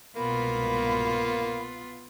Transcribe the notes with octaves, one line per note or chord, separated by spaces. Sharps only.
C2 G#2 B2 A#3 B3 F4 B5